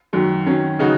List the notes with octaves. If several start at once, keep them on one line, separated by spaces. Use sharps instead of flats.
F#2 D#3 F#3
D#3 F#3 C#4
C#3 F#3 D#4 F#4